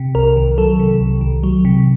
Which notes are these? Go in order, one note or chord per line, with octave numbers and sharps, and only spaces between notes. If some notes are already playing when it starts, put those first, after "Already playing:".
Already playing: C3
C2 A#4
D#3
F#3 A4
C3
C2
D#3
F#3
C3